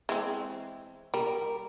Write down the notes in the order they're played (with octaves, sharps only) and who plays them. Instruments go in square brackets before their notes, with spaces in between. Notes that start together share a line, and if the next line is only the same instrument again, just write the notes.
[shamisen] E3 G#3 C4
[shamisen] G3 [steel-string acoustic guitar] A#4